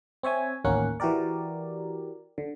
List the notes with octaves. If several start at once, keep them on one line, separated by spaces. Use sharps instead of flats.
C4 C#5 E5 G#5
A1 D#2 A#3 C#4 A#4 F#5
E3 F#4 G4 A#4 D5
D3